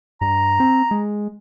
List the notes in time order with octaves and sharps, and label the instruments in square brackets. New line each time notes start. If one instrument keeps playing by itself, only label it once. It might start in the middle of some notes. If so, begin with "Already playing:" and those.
[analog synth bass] G2 [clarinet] A#5
[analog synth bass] C4
G#3